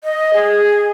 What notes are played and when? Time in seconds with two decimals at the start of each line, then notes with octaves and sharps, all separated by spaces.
0.04 D#5
0.34 G#4